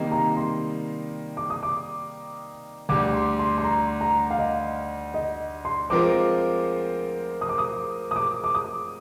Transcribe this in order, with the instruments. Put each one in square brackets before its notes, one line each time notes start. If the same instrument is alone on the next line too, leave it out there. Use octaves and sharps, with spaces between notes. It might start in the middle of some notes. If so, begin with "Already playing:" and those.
Already playing: [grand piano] C3 D#3 G3 A#3 D#4
[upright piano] A#5
C6
D6
D#6
D6
[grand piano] D2 D3 G3 [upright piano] D6
[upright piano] C6
C6
C6
A#5
A#5
F5
D#5
D#5
C6
[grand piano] F3 G#3 C4 F4 A#4 [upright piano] D6
[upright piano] D#6
D6
D#6
D#6
D6
D6
D#6